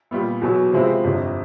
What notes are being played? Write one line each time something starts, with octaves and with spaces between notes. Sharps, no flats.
A#2 G3 B3
E2 B2 F#3
C3 F3 G#3 C4 E4
G1 F2 C3